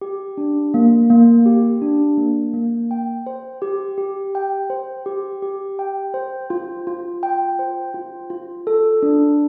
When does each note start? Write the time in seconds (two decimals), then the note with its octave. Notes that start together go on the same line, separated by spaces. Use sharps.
0.01 G4
0.37 D4
0.74 A#3
1.10 A#3
1.46 G4
1.82 D4
2.18 A#3
2.54 A#3
2.91 G5
3.26 C5
3.62 G4
3.98 G4
4.35 G5
4.70 C5
5.06 G4
5.42 G4
5.79 G5
6.14 C5
6.50 F4
6.87 F4
7.23 G5
7.59 C5
7.94 F4
8.30 F4
8.67 A4
9.03 D4